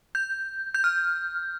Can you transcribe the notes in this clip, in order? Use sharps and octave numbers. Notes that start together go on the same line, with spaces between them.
G6
G6
F6